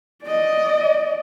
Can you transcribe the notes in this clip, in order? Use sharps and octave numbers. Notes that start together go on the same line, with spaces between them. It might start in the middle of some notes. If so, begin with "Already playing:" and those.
D5 D#5